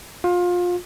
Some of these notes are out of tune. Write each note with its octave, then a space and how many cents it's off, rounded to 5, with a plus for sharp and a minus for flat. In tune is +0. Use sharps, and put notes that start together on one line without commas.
F4 +25